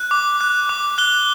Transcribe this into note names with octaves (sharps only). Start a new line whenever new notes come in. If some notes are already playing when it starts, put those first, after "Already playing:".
Already playing: F#6
D6
F#6
D6
F#6 G7